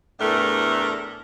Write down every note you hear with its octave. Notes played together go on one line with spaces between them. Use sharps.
E2 A2 A3 D4 A#4